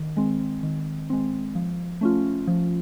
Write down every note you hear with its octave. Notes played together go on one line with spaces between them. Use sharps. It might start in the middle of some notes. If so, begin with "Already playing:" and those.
Already playing: D#3
G#3 C4
D#3
G#3 C4
F3
A3 C#4 F4
F3